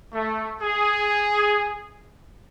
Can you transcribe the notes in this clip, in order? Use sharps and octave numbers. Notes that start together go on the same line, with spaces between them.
A3
G#4